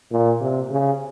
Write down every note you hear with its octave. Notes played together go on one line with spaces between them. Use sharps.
A#2
C3
C#3